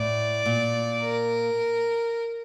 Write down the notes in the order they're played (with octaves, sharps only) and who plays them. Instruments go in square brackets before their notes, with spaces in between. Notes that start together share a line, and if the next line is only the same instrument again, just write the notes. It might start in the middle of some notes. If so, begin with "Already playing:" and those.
Already playing: [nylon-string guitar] A2 [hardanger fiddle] D5
[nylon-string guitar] A#2
[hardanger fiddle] A#4